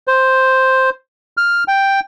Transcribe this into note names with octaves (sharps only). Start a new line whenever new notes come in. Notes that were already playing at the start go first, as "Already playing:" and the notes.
C5
F6
G5